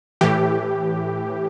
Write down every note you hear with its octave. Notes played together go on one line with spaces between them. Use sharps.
A2 E3 G4